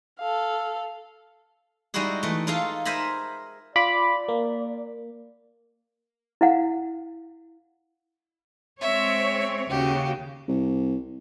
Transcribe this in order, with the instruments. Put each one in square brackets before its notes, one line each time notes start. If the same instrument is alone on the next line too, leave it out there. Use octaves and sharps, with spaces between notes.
[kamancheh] A4 F5
[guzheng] G3 G#3 D#4 E4 F#4 G#4
E3 A3
D#4 F4 G#4 A4 F5
A#4 C5 E5 G#5 A#5 B5
[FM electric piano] F4 B5 D6 [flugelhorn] D5
[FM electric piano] A#3
[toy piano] E4 F5 F#5
[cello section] G#3 C4 C#5 [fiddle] E5
[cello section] D#2 C#3 F#4 [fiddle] G4
[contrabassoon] C2